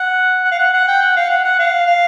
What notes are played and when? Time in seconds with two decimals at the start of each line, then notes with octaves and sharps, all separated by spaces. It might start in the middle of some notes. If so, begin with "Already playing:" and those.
Already playing: F#5
0.44 F#5
0.51 F5
0.59 F#5
0.73 F#5
0.88 G5
1.02 F#5
1.16 F5
1.30 F#5
1.44 F#5
1.59 F5
1.87 F5